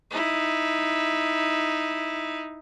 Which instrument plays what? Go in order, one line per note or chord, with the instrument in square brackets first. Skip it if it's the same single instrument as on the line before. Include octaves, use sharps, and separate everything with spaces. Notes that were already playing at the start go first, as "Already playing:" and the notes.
[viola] D#4 E4